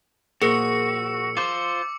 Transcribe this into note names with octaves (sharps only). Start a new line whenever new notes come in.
A#2 F3 F#4 G#4 A#4 E6 C#7
F4 C5 D6